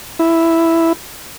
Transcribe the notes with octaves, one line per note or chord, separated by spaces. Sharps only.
E4